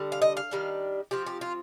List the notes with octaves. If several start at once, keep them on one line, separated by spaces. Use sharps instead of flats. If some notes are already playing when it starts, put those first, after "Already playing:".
Already playing: D3 G3
F5
D#5
F5
D#3 G3 D4
F3 C4 F4 G4
G4
F4